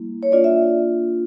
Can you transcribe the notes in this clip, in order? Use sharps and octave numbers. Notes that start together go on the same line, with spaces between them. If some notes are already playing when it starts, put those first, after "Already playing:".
Already playing: G3 A#3 E4
C#5
A#3 D4 F4 D5
E5